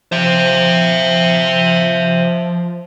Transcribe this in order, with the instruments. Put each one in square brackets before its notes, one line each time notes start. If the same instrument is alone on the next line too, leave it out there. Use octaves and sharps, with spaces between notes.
[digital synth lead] F3 [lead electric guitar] C5 E5